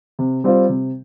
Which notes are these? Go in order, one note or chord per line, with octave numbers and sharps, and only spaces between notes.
C3
G3 C4 F4 C5
C3